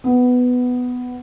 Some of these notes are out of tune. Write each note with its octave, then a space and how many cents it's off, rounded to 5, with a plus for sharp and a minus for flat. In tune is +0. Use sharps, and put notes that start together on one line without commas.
B3 +10